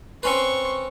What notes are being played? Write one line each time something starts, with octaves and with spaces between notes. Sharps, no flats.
C4 C#4 B4 C6 C#6